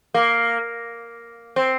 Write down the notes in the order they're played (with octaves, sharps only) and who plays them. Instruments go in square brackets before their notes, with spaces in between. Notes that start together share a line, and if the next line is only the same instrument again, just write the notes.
[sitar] A#3
C4